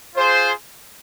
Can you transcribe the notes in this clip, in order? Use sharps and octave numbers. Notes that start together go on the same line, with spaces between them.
F4 G#4 C5